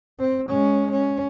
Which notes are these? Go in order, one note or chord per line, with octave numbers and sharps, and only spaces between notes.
C4
G#3 C#4
C#4